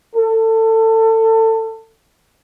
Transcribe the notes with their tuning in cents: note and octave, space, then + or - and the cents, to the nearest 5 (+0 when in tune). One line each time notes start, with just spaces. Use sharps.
A4 +25